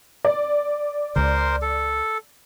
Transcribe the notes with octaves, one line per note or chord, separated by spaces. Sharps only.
D5
C#2 C#3 A#4 C5 C6
A4